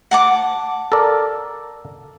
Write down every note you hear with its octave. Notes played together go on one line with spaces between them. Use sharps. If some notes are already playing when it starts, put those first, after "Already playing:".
F#5 A5 D6
A4 A#4 D5